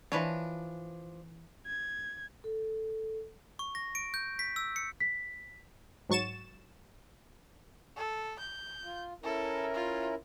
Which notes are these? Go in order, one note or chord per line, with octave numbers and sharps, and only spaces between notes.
E3 F3 D4 B4 C#5
G#6
A4
C#6
A#6
D7
G6
B6
E6
C#7
B6
G#2 F#3 C#6 A6 E7
A4
G6
F4
C#4 E4 A4 A#4
F4